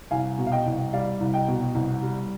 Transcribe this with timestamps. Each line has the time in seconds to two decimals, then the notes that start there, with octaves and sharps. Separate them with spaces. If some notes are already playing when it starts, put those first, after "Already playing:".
0.11 C2 F5 G#5
0.38 B2
0.47 F5
0.52 D#5 G5
0.66 C2
0.93 G3 D5 F5
1.20 C2
1.34 D#5 G5
1.48 B2
1.75 C2
2.02 G3